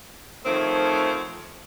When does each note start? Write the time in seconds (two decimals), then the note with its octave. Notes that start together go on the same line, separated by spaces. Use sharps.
0.45 D#3 F3 A3 C4 C#5